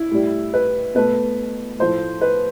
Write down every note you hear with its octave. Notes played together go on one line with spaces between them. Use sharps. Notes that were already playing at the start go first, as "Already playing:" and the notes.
Already playing: E4
A2 G3
B4
B2 A3 B4
A2 F3 A3 C5
B4